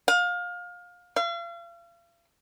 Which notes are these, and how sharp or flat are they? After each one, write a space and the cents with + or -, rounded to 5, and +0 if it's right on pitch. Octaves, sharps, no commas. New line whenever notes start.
F5 +25
F5 -40